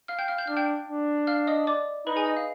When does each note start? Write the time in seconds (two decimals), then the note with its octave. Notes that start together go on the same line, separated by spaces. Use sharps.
0.08 F5 F6
0.18 G5 G6
0.28 F5 F6
0.38 G6
0.47 D4 F6
0.57 G5 G6
0.88 D4
1.27 F5 F6
1.47 D#5 D#6
1.67 D5 D6
2.07 D#4 B4 B5
2.16 G#4 G#5
2.26 D#5
2.37 F5